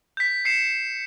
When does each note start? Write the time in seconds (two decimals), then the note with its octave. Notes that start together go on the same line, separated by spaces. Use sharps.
0.17 G6 B6
0.45 C7 C#7 E7